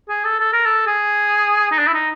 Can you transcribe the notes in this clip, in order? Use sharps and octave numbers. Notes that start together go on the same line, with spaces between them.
G#4
A4
A4
A#4
A4
G#4
D#4
D4
E4
D#4